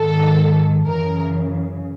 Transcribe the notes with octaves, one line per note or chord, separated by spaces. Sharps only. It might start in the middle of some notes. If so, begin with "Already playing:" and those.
Already playing: G#2 D#3 A4
F#2 C#3 E3 A#4